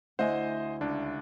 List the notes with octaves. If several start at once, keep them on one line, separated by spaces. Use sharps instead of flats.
D2 E4 C5 D#5 F#5 G#5
C#2 D4